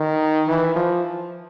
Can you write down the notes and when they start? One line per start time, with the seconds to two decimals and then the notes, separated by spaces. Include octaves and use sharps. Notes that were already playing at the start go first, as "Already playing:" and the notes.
Already playing: D#3
0.48 E3
0.76 F3